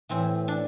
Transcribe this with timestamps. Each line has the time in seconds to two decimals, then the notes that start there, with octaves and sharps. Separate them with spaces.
0.09 A2 E3 C4
0.48 D4